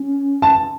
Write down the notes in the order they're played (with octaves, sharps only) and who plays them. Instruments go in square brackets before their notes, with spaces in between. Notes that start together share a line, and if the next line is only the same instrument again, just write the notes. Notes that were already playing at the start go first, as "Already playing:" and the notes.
Already playing: [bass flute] C#4
[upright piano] A5